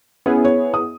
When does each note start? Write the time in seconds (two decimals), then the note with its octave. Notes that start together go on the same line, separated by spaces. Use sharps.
0.26 B3 C#4 E4 G#4
0.45 C#5
0.74 D#6